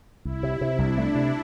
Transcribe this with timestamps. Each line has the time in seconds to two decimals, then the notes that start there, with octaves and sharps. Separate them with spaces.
0.25 C2 E4
0.43 C3
0.61 C3
0.79 C2 D4
0.98 A3
1.15 C3